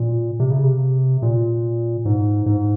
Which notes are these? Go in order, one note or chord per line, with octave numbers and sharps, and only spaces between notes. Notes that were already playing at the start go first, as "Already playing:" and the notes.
Already playing: A#2
C3
C#3
C3
A#2
G#2
G#2